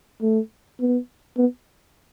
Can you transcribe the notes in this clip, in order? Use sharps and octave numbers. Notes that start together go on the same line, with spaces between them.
A3
B3
B3